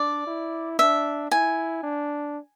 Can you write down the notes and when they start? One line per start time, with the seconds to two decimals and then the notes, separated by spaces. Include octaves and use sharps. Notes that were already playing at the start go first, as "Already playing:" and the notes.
Already playing: D4 D5
0.27 E4
0.79 D4 E5
1.31 E4 G#5
1.83 D4